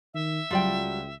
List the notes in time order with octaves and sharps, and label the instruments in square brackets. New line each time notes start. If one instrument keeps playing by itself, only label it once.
[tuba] D#3 [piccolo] E5
[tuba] C#2 [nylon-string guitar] F#3 G3 [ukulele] F4 D5 G5